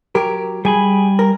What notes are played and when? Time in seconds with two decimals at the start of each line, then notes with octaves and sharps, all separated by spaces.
0.15 F#3 G4 A#4
0.65 G3 G#4 G#5 B5
1.19 A#4